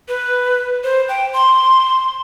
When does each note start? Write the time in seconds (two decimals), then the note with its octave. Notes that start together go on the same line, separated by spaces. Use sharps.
0.08 B4
0.84 C5
1.09 G5
1.33 C6